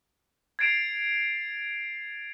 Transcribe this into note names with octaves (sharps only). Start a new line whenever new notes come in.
G#6 A6 C7 D7 E7 F7